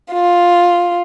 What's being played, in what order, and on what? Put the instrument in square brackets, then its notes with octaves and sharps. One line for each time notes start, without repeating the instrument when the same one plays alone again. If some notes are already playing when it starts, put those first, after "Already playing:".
[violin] F4